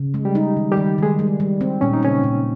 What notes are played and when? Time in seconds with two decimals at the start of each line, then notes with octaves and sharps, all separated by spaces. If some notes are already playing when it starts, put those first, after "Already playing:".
Already playing: C#3
0.14 G#3
0.25 G3 G4
0.35 D#4
0.57 D#3
0.71 G3 G4
0.77 D#3
0.98 D#3 G#3 G#4
1.19 G3
1.40 G3
1.61 C4
1.81 A#2 C#4
1.93 D#4
2.03 C#3 C4 C#4
2.23 A#2